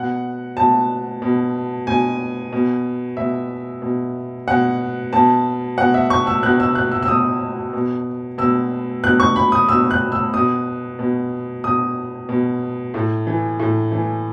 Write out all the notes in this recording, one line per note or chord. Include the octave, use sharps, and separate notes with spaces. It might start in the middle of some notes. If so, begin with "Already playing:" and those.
Already playing: B2 F#5
B2 A5
B2
B2 G#5
B2
B2 E5
B2
B2 F#5
B2 A5
B2 F#5
E5
C#6
E6
B2 F#6
E6
F#6
E6
E6
B2 D#6
B2
B2 E6
B2 F#6
C#6
B5
D#6
B2 E6
F#6
E6
B2 D#6
B2
B2 D#6
B2
A2
E3
A2
E3